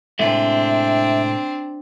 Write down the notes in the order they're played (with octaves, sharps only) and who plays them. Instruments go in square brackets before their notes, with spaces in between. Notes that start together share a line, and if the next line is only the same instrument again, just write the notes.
[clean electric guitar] A2 C3 G#3 [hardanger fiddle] C4 D4 [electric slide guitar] E5